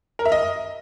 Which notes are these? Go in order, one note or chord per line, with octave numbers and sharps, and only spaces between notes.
A#4
E5
D#5